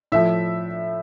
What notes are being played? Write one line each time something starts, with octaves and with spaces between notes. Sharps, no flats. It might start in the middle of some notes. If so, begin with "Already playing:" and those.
A2 F3 E5